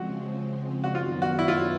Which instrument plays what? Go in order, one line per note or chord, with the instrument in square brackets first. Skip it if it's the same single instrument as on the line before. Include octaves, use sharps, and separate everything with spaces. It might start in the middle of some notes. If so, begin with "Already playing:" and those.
Already playing: [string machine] C#3 F3 G#3 C4 [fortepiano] F#4
[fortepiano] F#4
[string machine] F#2 D#3 F#3 B3 [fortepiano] F4
[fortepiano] F#4
E4
F4